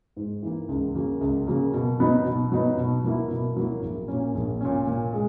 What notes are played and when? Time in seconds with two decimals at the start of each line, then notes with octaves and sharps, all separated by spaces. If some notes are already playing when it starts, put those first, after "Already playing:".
0.16 G#2
0.43 E3 A#3
0.68 C#2
0.95 C#3 F#3 A#3
1.21 C#2
1.47 C#3 F#3 A#3
1.74 B2
2.00 F#3 B3 D#4
2.26 B2
2.52 F#3 B3 D#4
2.78 B2
3.04 F#3 A#3 E4
3.31 B2
3.56 F#3 A#3 E4
3.82 A#1
4.08 A#2 A#3 C#4
4.35 A#1
4.60 A#2 A#3 C#4
4.87 A#2
5.13 G#3